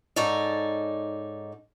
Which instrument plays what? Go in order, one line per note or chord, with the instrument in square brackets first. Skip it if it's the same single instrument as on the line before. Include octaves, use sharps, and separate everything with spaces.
[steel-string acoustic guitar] G#2 D#4 A4 C#5 D5